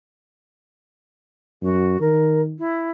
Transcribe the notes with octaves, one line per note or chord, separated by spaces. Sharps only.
F#2 F#4
D#3 A#4
E4